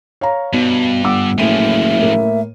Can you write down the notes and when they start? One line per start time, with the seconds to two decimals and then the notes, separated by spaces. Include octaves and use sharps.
0.21 C#5 F5 A#5
0.53 G2 B2
1.04 G1 F#5 D6 E6
1.38 F#1 A2 E3 F3 E5 D#7
1.99 A2 A#3